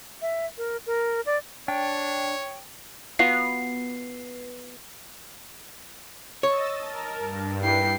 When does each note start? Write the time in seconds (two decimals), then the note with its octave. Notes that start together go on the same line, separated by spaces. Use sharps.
0.22 E5
0.58 A#4
0.86 A#4
1.26 D5
1.68 D4 C#5 G5
3.19 B3 F4 F#4 A#5 C7
6.43 C#5 D#5 E6 A6
6.83 A#4 A5
7.18 G2
7.63 E4 B4 G5 C7